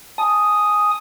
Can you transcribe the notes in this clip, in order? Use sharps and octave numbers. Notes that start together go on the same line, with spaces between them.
G#5 A5 D#6